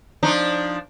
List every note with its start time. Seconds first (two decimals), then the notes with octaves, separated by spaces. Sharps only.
0.23 F3 D4 D#4